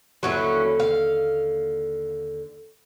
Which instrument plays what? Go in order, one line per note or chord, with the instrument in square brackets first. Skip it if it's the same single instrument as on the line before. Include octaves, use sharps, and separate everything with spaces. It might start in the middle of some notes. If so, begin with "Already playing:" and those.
[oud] D#2 D3 A#3 [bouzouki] F#3 C#4 E4
[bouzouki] F5